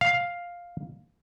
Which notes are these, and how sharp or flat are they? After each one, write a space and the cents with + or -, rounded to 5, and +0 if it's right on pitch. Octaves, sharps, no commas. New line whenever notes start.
F5 +5